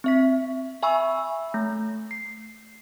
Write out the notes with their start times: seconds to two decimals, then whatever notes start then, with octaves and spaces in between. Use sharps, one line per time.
0.04 C4 E5 B6
0.82 E5 G#5 B5 C#6 E6
1.54 A3
2.11 C7